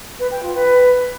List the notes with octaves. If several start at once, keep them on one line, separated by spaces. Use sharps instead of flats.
B4
G5
F4
B4